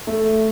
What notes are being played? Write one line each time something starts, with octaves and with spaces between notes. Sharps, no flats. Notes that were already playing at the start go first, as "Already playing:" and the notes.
A3